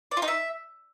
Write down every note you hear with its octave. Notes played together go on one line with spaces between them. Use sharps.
D5
F4
D#4
E5